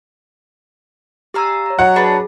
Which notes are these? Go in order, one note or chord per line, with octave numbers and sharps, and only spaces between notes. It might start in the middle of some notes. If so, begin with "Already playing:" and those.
G4 D5 F5 G#5 A#5 E6
C#5 A#5
F#3 D#5 F#5
D4 G#4 B4 D5